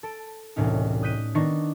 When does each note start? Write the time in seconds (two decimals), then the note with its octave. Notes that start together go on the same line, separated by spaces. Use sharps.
0.03 A4 D7
0.56 E1 C2 A2 C#4 D#4
1.02 D#6 F#6 G6 B6 D#7
1.35 D#3 B3 D4 D#4 C#6 A#6